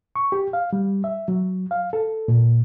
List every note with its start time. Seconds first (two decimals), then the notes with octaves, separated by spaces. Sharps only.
0.16 C#6
0.32 G4
0.53 F5
0.73 G3
1.04 E5
1.28 F#3
1.71 F5
1.93 A4
2.28 A#2